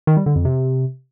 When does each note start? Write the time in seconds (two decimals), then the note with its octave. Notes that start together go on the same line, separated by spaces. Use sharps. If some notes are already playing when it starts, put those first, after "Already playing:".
0.07 D#3
0.17 G3
0.26 D3
0.36 F2
0.45 C3